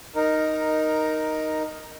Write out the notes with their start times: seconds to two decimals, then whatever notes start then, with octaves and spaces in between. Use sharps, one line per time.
0.15 D#4 A#4